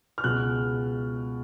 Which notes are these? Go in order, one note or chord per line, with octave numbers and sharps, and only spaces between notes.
F6
C#2 B2 G#3 F#6